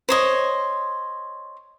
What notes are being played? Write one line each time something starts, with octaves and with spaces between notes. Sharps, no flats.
C5 C#5 D#5